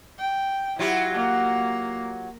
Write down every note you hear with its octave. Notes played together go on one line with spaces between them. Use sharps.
G5
F#3 E4 F4 G4
A#3